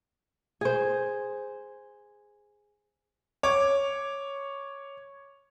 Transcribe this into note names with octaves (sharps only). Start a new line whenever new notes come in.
G#4 C5
C#5 D6